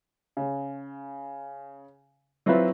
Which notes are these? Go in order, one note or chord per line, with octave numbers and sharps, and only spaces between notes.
C#3
F#3 C4 E4 F4 B4 E5